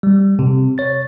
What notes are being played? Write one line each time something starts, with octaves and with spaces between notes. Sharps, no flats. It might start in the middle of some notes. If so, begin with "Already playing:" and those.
G3
C3
C#5 A6